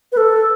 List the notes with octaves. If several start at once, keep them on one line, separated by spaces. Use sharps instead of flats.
B4
A4